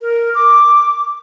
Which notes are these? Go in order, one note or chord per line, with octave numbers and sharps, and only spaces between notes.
A#4
D6